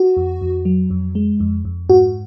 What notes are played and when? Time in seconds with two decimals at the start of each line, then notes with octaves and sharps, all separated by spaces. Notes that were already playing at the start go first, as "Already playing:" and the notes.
Already playing: F#4
0.17 F2
0.41 F2
0.65 F#3
0.90 F2
1.15 G#3
1.40 F2
1.65 F2
1.89 G#2 F#4